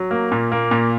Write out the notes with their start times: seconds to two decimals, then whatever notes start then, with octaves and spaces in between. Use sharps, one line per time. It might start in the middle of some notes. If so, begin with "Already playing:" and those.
Already playing: F#3
0.11 A#3
0.32 A#2
0.52 A#3
0.71 A#2